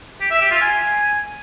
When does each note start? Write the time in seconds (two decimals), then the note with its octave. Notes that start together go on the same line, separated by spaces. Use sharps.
0.20 G4
0.31 E5
0.41 G4
0.51 F4
0.61 G#5